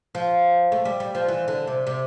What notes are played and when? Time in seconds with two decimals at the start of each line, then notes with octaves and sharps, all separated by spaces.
0.15 F3
0.72 A3
0.85 G3
1.00 G3
1.15 F3
1.28 E3
1.48 D3
1.67 C3
1.87 C3